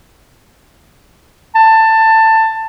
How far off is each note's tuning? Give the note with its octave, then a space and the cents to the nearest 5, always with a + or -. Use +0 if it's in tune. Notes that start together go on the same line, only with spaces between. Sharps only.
A5 +15